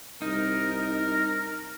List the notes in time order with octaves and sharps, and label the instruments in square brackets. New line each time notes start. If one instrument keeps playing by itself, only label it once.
[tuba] C2 [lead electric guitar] D#4 [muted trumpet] A#4